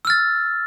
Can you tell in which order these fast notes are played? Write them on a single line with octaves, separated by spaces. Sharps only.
E6 F6 A6